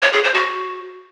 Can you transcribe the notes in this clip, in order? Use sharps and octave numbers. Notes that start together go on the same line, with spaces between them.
C#5
G#4
C5
F#4